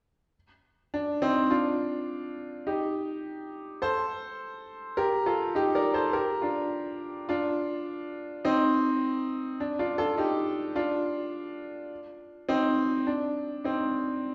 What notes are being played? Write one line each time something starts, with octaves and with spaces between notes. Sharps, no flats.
D4
C4 D#4
D4 F4
D#4 G4
A4 C5
G4 A#4
F4 A4
D#4 G4
A#4 D5
A4 C5
G4 A#4
D4 F4
D4 F4
C4 D#4
D4
D4 F4
F4 A4
D#4 G4
D4 F4
C4 D#4
D4
C4 D#4